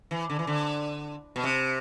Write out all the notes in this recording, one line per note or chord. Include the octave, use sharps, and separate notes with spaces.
E3
D3
E3
D3
B2
C3